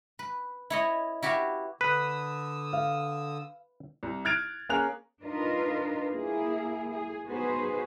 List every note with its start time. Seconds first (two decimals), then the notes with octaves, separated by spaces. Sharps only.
0.19 B4
0.70 E4 C#5 D#5
1.23 E4 F#4 G4 B4 E5 F5
1.81 D3 B4 D#6 E6
2.73 F5
4.03 C2
4.25 F6 F#6 G#6 A6 D7 F7
4.69 A#3 C#4 G#4 A#4 F#6 F7
5.24 D4 D#4 F4 A#4 B4 D#5
6.12 A#3 E4 G#4
6.92 G#4
7.27 B3 D#4 F#4 G#4 B4 C5